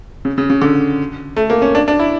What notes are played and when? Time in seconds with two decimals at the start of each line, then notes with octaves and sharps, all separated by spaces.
0.25 C#3
0.38 C#3
0.50 C#3
0.62 D3
1.37 A3
1.50 A#3
1.62 C#4
1.75 D4
1.88 D4
1.99 E4